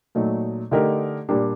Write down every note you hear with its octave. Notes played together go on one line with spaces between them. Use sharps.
A#2 F#3 A3 D#4
D3 A3 D#4 G4 A#4
A#2 G3 A#3 D4 G4